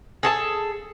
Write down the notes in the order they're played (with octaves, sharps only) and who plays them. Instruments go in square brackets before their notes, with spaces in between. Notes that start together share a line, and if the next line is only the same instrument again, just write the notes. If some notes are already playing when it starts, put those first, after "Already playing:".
[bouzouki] G#4 A4 A5